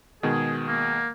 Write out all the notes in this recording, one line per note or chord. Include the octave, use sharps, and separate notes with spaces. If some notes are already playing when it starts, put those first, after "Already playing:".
B2 D#3 G#3 G#4
A#3